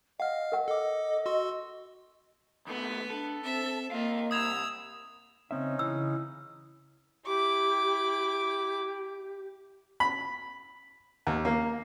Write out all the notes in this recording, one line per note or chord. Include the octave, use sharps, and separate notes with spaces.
D#5 F5 F#5 F6
A#4 F#5
A4 D#5 D6
F#4 C6 E6
D#2 A3 B3 B4
D4 A4
C4 E5
A#3 F4 D#5 F5
C2 D#6 E6 G#6 F7
C#3 C4 C#4 D#4 E5
C#3 E3 E6
E4 G4 D6
B5
D#2
A#3